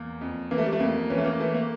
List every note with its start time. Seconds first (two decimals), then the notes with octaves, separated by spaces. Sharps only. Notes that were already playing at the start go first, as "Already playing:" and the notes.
Already playing: E2 A#3
0.21 F2
0.51 E3 A#3
0.58 A3
0.66 G3
0.72 A3
0.80 F2 A#3
1.10 E3 C#4
1.18 A3
1.25 A#3
1.40 E3 A3
1.54 A#3